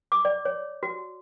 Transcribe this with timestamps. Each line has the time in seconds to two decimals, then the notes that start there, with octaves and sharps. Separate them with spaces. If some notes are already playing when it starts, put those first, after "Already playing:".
0.12 D6
0.25 D5
0.45 C#5
0.83 F#4